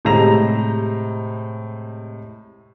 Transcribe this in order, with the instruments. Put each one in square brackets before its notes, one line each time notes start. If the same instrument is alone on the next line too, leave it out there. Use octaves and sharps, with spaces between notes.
[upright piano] A2 C3 G#3 A#5 A#6 F7